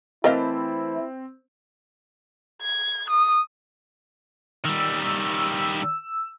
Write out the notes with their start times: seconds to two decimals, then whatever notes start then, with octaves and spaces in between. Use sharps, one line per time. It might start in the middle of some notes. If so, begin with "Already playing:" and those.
0.24 E3 A3 C4 E4 A#4 D#5 F5 A5
2.62 G#6
3.10 D#6
4.65 D#3 G3 E6